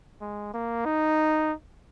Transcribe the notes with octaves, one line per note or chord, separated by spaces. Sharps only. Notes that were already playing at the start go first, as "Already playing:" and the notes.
G#3
A#3
D#4